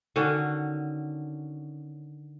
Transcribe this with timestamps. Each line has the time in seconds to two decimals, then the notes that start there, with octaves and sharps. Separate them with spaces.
0.16 D3 D#3 C#4 F#4